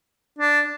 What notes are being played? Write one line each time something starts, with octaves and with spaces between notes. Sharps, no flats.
D4